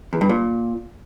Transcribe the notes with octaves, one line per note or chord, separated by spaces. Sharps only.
E2
G2
A#2